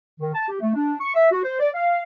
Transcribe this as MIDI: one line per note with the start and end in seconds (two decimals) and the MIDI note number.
0.20 0.30 51
0.34 0.48 81
0.49 0.57 67
0.60 0.71 57
0.74 0.94 62
1.00 1.10 85
1.15 1.27 76
1.31 1.43 66
1.43 1.59 72
1.59 1.69 74
1.74 2.03 77